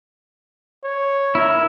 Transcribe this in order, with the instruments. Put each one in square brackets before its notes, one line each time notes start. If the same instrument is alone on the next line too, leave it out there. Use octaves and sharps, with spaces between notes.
[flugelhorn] C#5
[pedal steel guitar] E4 A#4